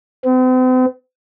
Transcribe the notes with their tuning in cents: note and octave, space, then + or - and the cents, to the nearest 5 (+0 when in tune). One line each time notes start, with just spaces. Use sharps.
C4 -45